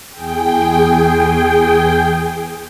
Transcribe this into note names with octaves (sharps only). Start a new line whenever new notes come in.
E2 G#4 G5